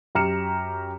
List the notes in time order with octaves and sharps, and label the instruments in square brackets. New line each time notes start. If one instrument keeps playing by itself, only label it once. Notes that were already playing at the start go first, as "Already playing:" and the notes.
[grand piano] F#2 G4 A#5 F6 C#7 E7